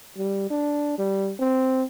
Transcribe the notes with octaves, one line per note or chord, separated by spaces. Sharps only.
G3
D4
G3
C4